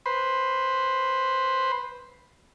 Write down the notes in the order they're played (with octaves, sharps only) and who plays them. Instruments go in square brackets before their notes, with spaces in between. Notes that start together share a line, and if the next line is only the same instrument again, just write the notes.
[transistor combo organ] B4 C5